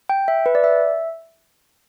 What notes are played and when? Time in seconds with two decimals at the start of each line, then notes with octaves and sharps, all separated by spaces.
0.09 G5
0.28 E5
0.46 B4
0.55 D5
0.64 E5